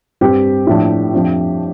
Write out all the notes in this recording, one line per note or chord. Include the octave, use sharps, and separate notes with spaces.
G2 G3 C4 G4
A2 F3 A3 D4
F2 F3 D4